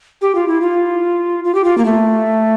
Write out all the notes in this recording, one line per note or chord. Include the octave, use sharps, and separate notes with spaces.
G4
F4
E4
F4
F4
G4
F4
A#3
A3